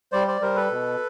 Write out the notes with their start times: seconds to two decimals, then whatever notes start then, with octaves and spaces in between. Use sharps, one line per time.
0.12 G3 C5 D5
0.27 C5 D5
0.41 G3 A#4 C5
0.56 A4 B4
0.71 B2